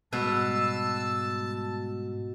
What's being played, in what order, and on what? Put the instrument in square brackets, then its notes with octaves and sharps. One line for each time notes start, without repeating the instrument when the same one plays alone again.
[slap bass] G#2 G3 G#3 [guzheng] B2 B4 [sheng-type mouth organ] A5 [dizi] E6